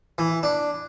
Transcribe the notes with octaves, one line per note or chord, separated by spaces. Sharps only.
E3
D4